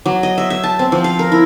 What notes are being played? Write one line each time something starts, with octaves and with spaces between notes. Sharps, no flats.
F#3
D#5
E5
E5
A5
C4
F3
F5
A#4
E4